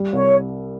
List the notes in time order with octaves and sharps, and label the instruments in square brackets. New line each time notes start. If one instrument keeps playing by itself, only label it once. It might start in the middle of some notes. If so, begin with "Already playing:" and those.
Already playing: [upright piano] G3
[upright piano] C2 [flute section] C#5